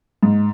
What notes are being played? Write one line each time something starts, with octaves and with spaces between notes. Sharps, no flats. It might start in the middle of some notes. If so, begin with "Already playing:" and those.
G#2